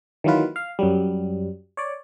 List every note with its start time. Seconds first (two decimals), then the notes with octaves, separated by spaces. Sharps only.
0.24 D#3 E3 F#3 A#3 F4 B4
0.56 F5
0.79 F#2 F#3 G3
1.77 C#5 D5